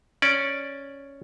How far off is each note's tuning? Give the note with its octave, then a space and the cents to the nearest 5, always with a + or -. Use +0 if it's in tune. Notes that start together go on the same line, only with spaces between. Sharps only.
C#4 +0 D5 +0